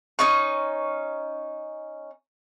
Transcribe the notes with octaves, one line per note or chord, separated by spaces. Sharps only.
C#4 D#4 C#6